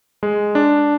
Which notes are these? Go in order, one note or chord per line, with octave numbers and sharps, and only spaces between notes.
G#3
D4